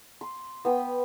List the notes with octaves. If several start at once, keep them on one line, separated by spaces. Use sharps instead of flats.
C6
B3 G5 B5 D#6